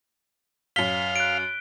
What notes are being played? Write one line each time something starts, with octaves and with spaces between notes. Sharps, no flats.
F#2 F5 B6 G7
F#6 D7